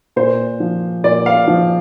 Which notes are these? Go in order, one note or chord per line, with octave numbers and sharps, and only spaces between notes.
A#2 C5
F3
A#2 D5
F5
F3